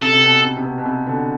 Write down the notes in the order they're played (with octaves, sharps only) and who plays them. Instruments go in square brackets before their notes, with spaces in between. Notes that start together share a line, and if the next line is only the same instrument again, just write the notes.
[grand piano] C3 [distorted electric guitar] A4
[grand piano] C3
B2
C3
C3
B2
B2
C3
B2 D3